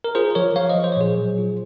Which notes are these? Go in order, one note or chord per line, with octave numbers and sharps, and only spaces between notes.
A#4
F4 G#4 C5
F3 A#4 C#5
F3 C#5 F5
C5 D#5
F3
C5
C#5
A#2 G#4 C5
F#3
F4